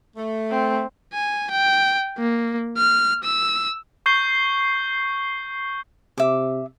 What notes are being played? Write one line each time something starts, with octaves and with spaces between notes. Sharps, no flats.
A3
C4
G#5
G5
A#3
F6
E6
C#6 G6 C7 G7
C3 E5 D6